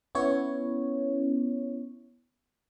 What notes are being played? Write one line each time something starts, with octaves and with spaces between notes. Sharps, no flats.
B3 C#4 E4 C#5